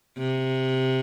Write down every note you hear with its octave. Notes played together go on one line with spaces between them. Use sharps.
C3